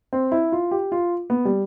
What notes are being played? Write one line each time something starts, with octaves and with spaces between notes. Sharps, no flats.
C4
E4
F4
G4
F4
B3
G3